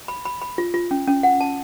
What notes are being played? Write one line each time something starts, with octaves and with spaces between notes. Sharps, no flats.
B5
B5
B5
F4
F4
C#4
C#4
F#5
A5